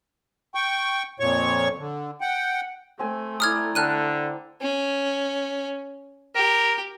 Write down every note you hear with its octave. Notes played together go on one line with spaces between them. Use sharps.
G5 C#6
F2 A#2 C#5 C#6
D3
F#5 G5
A3 C4 G#5
E4 D5 A#5 D#6 F6 G#6
D3 E5 G5 A5 F6 F#6 D#7
C#4
G4 A#4